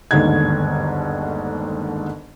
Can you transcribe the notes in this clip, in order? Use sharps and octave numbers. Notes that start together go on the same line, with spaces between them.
G1 D#2 G#2 D3 D#4 G#6